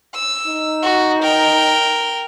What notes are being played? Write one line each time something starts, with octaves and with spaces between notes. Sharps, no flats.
E6
D#4
F#4
A#4 G5